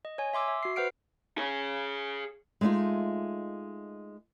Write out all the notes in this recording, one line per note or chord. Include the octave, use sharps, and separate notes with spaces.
D#5
C#5 G#5
E5 C6 D6 E6
E5
F#4 C7
B4 C5 F#5 F6 C7 D7
G#4 C#5
G#3 A3 C#4 D#4 F4